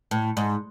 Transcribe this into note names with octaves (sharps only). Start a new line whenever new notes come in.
A2
G#2